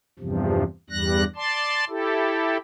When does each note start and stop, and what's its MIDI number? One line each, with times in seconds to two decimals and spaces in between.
0.19 0.63 40
0.19 0.63 43
0.19 0.63 48
0.19 0.63 53
0.90 1.24 40
0.90 1.24 43
0.90 1.24 55
0.90 1.24 90
0.90 1.24 94
1.36 1.85 74
1.36 1.85 81
1.36 1.85 84
1.89 2.58 64
1.89 2.58 67
1.89 2.58 69